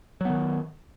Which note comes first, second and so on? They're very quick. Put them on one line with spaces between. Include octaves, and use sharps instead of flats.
F#3 B3 D#3